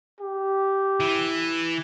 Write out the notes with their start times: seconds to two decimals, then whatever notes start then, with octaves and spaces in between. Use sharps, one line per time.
0.20 G4
1.00 E3